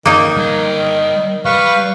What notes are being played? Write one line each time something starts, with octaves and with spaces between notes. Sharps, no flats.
D#3 A#3 D#4
G3 A#5
G3 B4 F5 C#6